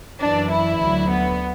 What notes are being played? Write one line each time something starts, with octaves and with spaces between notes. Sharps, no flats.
F#2 E3 D4
E4
D2 D3 F#3
B3